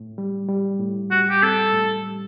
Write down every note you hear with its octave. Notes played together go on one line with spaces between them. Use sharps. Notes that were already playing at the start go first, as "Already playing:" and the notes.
Already playing: A2
G3
G3
A2
G3 F#4
G4
C4 A4
A2
G3